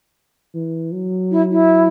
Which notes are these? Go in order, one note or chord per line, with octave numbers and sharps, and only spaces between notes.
E3
F#3
E4
E4